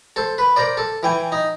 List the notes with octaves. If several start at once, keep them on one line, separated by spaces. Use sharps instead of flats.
A4 C5
B4
A#4 C5 D5
A4
E3 G5 G#5
D#4